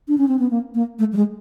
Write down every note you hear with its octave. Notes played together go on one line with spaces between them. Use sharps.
D4
C#4
C4
B3
A#3
A#3
A3
G3
G#3